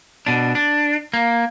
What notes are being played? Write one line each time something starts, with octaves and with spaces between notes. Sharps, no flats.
B2 D4
D4
A#3